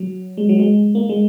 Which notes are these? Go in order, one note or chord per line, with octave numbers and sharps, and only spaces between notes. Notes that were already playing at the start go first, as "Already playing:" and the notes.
Already playing: F#3
G#3
F#3
G#3
A#3
G#3